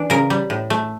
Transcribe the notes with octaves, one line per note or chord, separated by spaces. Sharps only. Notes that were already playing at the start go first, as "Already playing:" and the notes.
Already playing: E3 D4
C#3 A#4
G3
A2
A3